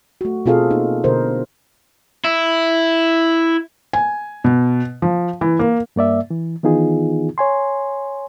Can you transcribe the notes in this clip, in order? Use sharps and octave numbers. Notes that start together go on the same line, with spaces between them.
A3 F#4
B2 C4 F4 G#4 A4 F5
A#3 D#4
B2 D3 A#4 C5 D#5
E4
G#5
B2
F3
E3
A#3
G2 A#3 D5 E5
E3
D#3 E3 B3 D#4 F4 G#4
C#5 G#5 C6